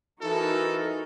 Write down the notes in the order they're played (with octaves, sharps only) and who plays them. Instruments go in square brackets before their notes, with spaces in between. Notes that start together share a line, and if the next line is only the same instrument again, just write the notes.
[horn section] E3 A4 [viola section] D#4 F#4 A#4